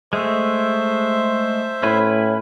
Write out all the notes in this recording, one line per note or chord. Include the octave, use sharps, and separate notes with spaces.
G#3 A3 C5 E5
A2 C#4 E4 B4